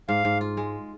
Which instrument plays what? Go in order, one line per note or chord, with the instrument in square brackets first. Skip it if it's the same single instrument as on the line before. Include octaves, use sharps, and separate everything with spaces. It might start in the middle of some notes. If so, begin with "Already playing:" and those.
[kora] G#2 [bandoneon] F5
[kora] G#2
F4
G#3